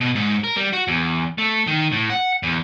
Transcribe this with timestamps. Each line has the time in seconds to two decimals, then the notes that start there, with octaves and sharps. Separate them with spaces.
0.01 B2
0.15 G#2
0.44 A#4
0.56 G3
0.73 F#4
0.88 E2
1.38 A3
1.67 D#3
1.92 A2
2.10 F#5
2.43 E2